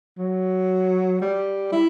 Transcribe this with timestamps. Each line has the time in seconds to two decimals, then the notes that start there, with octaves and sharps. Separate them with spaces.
0.18 F#3
1.21 G3
1.72 E4